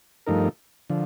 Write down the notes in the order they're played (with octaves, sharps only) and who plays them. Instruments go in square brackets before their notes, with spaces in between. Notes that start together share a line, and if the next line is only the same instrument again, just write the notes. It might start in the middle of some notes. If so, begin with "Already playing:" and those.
[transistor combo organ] G2 F3 A3 D#4 A#4
D3 F3